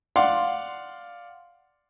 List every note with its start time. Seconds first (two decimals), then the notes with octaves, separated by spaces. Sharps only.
0.16 D5 F5 F#5 C6